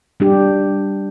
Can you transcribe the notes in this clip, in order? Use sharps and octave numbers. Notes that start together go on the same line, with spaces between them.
G3 D4 G4